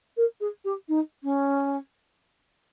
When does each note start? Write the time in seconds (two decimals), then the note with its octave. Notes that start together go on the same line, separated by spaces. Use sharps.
0.17 A#4
0.41 G#4
0.65 G4
0.88 D#4
1.23 C#4